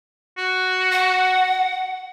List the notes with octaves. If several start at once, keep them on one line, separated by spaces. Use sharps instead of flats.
F#4
F#5